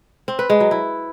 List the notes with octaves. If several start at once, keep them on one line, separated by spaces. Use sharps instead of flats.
C4
B4
G#3
F#3
E4